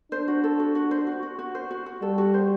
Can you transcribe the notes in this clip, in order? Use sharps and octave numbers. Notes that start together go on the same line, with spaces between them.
D4 C5
F#4
A4
F#4
F#4
C5
F#4
F#4
F#4
C5
F#4
F#4
G3 A4
F#4
C5